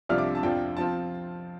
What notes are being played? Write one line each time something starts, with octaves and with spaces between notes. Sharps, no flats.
C2 C3 F3 D4 F4 F6
D6
A5
F2 F3 D4 F4 G5
F3 C4 F4 A5